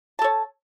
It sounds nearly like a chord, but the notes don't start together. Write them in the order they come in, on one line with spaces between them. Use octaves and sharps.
A5 A4 C#5